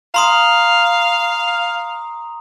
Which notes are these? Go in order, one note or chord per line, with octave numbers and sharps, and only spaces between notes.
F5 A#5 C6 D#6